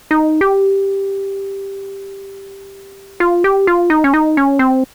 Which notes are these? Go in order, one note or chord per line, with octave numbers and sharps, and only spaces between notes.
D#4
G4
F4
G4
F4
D#4
C#4
D#4
C#4
C4